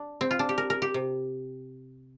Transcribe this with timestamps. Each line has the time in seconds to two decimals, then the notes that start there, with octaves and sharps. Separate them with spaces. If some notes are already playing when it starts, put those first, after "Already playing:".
Already playing: D4
0.21 C4
0.31 F4
0.39 D4
0.49 G4
0.58 A#4
0.70 A#4
0.82 G4
0.94 C3